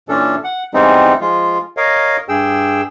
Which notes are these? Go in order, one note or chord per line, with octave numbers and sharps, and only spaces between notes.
A#2 E3 C#4 D4 A4
F#5
E3 G3 G#3 B3 C4 D#4
F3 G#3 F4
A#4 C#5 D#5 F5
G2 G#4 G5 E6